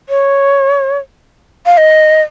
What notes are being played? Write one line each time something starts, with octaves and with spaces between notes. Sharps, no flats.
C#5
F5
D#5